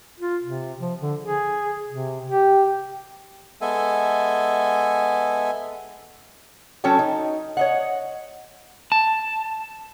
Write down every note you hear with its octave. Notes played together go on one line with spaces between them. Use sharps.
F4
C3
F3
D3
G#4
C3
G4
G#3 B3 A4 E5 G#5
F#3 C#4 A4 C#5 G5
D#4
C#5 D#5 F#5
A5